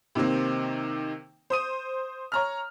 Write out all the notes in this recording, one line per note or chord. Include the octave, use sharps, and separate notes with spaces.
C3 D#3 A#3 C4
C5 D#6 D#7
C#5 A#5 F6